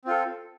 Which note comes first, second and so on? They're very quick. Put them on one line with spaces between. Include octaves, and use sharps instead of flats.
C4 F4 A4